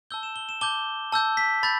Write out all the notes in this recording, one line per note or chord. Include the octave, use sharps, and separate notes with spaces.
A5 E6 G6 G7
E7
G7
E7
A5 D6 G6 G7
A5 E6 G6
B6
B5 G6 A6